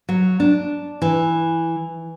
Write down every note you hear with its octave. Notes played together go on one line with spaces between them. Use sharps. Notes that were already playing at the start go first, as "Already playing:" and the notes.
F#3
D4
E3